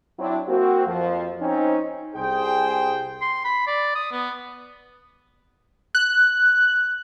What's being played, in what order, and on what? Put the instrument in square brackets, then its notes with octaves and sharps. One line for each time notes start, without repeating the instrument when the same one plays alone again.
[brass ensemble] F#3 C4 D4 E4
A#3 C4 F#4
F2 F3
C4 C#4 D#4
C2 G#4 C5 G5
[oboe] C6
B5
D5
D#6
B3
[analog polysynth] F#6